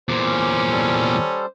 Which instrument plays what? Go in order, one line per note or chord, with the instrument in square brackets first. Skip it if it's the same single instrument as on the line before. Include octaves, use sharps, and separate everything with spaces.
[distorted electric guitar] E2 A#2 [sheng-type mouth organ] C5 [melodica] D6
[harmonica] C#4
[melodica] G3 A4